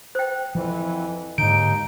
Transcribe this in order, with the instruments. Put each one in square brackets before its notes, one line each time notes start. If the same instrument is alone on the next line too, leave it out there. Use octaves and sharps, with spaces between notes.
[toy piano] C5 G5
[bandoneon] F2 E3 [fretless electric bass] F3
[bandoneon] D#2 D#4 G6 [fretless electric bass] G#2 D3 [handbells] D7